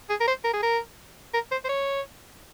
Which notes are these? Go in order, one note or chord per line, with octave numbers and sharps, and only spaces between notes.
G#4
A#4
C5
A#4
G#4
A#4
A#4
C5
C5
C#5